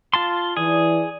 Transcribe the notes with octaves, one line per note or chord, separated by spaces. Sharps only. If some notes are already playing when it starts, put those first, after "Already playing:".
F4 A5 C6
E3 G#4 D5